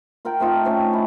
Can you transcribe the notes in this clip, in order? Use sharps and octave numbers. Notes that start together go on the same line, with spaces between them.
F4 A#4 F#5 G5
A3 C4 D#4 F4
A3 C4 C#4
E4